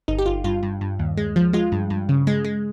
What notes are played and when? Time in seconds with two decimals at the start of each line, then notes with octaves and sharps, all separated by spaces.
0.08 G1 D#4
0.18 G4
0.26 G1 F4
0.44 G2 F4
0.63 G2
0.81 G2
0.99 D#2
1.17 G#3
1.36 F3
1.53 G#3 F4
1.72 G2
1.90 G2
2.09 C#3
2.27 G#3
2.45 G#3